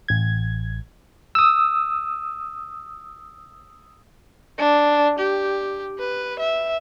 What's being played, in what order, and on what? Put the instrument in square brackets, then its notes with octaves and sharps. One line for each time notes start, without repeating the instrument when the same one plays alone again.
[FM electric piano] A1 G#6
[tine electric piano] D#6 E6
[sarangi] D4
G4
B4
E5